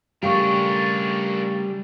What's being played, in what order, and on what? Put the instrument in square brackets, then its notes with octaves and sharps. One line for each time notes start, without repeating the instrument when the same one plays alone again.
[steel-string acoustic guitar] C#3 A3 G4 [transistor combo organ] G3 [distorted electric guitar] D4 A#4 [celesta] F5 C#6